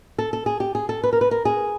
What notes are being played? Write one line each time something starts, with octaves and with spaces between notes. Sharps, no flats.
A4
A4
G#4
G4
G#4
A4
B4
A#4
B4
A#4
G#4